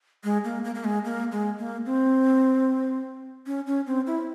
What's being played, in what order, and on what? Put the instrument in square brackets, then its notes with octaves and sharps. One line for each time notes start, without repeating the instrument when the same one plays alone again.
[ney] G#3
A#3
A#3
A#3
G#3
A#3
G#3
A#3
C4
C#4
C#4
C4
E4